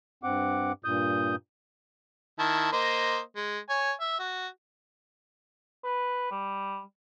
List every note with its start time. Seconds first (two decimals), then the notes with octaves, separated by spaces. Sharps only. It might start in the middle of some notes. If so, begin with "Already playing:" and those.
0.23 G2 C4 F#5 D6
0.84 G2 A#2 D#6 G6
2.39 D#3 E4 A5
2.72 A#3 C5 D#5
3.36 G#3
3.69 C#5 G#5
4.01 E5
4.19 F#4
5.84 B4
6.31 G3